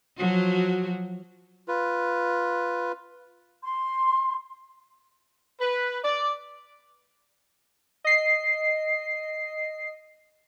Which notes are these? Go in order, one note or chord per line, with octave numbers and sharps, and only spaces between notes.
F3 F#3 F#4
F4 B4
C6
B4
D5
D#5 C7